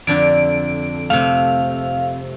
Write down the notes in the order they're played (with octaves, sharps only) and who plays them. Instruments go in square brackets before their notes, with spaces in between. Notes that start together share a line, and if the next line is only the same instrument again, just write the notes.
[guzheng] F2 D3 D4 [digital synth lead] D7
[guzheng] C3 A3 [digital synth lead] F5